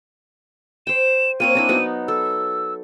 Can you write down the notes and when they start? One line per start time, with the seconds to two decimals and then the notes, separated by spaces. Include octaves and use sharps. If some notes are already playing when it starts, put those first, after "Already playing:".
0.87 C5 G5 E7
1.40 A#3 C4 C#5 D#7
1.55 C4 D4 E4
1.69 F#3 B3 D#4
2.08 A4 E6